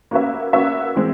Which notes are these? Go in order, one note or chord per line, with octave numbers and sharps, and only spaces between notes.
A#3 C#4 F#4 B4 E5
A#3 C#4 F#4 B4 E5
E3 G#3 C4